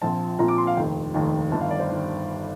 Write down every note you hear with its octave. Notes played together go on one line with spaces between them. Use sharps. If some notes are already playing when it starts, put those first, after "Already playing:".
A#1 A#2 F3 C4 A5
A#1 A#2 F3 C4 A#5
D6
C6
F5
F1 D#2 D#3 G5
F1 D#2 D#3
G1 G2 D#3 A5
F5
D5
C5
D#3